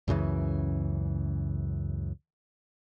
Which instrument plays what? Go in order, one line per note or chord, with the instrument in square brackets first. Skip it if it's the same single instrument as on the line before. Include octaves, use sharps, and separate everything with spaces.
[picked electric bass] C#2 F#2 C#3 E3